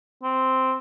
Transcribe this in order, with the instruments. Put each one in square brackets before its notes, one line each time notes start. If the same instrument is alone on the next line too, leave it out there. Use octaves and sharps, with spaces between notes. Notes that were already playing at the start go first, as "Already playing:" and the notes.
[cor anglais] C4